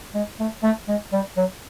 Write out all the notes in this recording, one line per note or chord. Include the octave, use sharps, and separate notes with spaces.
G#3
A3
A3
G#3
G3
F#3